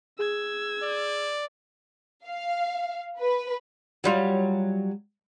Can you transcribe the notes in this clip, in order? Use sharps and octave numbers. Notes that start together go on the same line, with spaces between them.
G#4 E6 G#6
D5
F5
B4
F#3 G3 F4